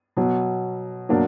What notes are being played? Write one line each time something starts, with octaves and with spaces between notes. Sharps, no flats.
B2 F#3
B2 F#3 A#3 D4